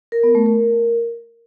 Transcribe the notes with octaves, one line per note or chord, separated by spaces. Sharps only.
A#4
B3
A3
A#4